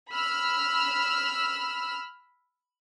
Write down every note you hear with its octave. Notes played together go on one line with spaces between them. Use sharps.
B5 E6 F6